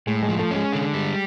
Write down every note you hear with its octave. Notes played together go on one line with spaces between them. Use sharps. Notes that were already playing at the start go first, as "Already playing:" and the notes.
A2 G#3
G#3
F3
A3
G#3 C#4
D3
G3